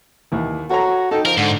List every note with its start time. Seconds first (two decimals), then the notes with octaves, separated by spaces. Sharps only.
0.32 D#2 E3
0.70 F#4 A4 C#5 A#5
1.11 D#4 A4 G5
1.26 F3 A#4
1.37 G#2 D3